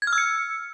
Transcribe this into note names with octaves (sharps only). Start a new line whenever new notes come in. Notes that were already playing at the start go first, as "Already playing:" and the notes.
G#6
F6
E6
C#7